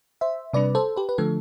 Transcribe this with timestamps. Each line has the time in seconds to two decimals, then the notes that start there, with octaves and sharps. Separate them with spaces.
0.21 C5 E5
0.53 C3 G3 D4 B4 D5
0.75 A4 C5
0.97 G4 B4
1.09 B4
1.18 D3 F3 A3 A4